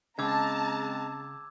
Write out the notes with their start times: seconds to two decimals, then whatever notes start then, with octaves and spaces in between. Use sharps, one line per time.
0.19 C#3 G#3 C4 A5 A#5 D6 E6 G#6